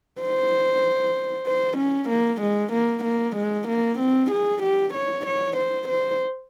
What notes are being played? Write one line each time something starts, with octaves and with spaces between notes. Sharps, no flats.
C5
C5
C#4
A#3
G#3
A#3
A#3
G#3
A#3
C4
G#4
G4
C#5
C#5
C5
C5